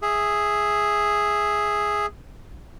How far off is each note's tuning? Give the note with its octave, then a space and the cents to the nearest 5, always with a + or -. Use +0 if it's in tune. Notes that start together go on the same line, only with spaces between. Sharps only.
G#4 +0 E5 +0